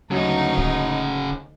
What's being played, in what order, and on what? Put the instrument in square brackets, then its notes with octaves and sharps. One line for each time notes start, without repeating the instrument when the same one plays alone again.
[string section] D2 D#4 [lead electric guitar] C#3 F#4 [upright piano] F#3
[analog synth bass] D1